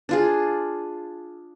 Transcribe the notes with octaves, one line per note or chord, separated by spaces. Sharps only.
D4 F4 G#4